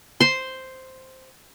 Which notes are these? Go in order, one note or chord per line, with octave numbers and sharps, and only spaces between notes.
C5 C6